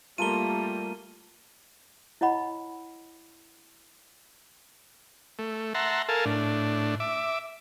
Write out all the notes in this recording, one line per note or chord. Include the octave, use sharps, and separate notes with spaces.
G3 A3 A#3 F4 A4 A#4 D#7 G7
E4 C#5 D#5 F#5 B5
A3
E5 F#5 A5 A#5 C6
A4 A#4 F5 G#5 A5
A2 D4
E5 D6